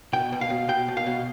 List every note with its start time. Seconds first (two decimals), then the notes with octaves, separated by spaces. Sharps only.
0.13 B2 G5
0.32 B2
0.41 F5
0.50 B2
0.68 B2 G5
0.88 B2
0.97 F5
1.06 B2